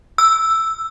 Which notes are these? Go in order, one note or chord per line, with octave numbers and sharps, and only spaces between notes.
E6